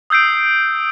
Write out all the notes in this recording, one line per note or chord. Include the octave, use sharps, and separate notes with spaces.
D#6 E6 G6 C7 D7